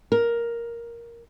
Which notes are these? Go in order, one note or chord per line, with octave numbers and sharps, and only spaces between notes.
A#4